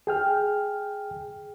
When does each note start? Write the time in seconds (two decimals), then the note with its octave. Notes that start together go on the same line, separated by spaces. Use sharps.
0.07 G#4 G5 F6